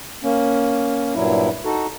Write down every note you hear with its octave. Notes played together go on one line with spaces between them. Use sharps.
A#3 C#4
G2 A#2 F#3 E4
D#4 F#4 A4